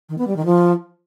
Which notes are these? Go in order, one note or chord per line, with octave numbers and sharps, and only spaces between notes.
D#3
B3
G3
D#3
F3